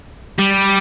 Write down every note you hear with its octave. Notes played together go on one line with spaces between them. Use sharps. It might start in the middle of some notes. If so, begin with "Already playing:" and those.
G3